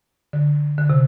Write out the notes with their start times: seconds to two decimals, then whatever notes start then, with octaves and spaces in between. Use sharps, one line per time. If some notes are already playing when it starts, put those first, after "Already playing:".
0.33 D3
0.78 D3
0.90 C3